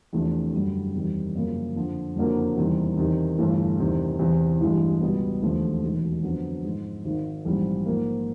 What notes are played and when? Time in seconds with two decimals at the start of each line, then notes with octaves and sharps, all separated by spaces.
0.13 E2 C3 F3 A3 D4
0.53 F#2 D3 G3
0.94 E2 C3 D#3 G3
1.34 G1 F#2 C#3 F3 A#3
1.75 F2 D3 F3
2.16 F#1 F2 D3 F#3 A#3
2.57 E2 C3 D#3 G3
2.97 E2 C3 D#3
3.38 G1 G2 E3 A3
3.79 E2 C3 D#3
4.19 E2 C3 E3
4.61 A1 G2 E3 G#3
5.01 C#2 B2 G3 B3
5.42 E1 D#2 D3 F3 A3
5.83 E1 D#2 D#3 F#3
6.23 F2 D3 F#3 B3
6.64 G#2 F3 G#3
7.04 G#1 G#2 D#3
7.45 A#1 G#2 E3 G3 C4
7.86 G#2 F3 A#3